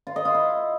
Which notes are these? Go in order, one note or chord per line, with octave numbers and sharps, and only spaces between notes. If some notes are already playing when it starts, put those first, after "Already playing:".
F4
D#5
F4
E4